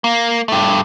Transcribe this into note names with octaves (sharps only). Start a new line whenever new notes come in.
A#3
G2 A3